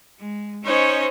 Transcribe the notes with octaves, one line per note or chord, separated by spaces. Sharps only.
G#3
C#4 D#4 C5 C#5 D#5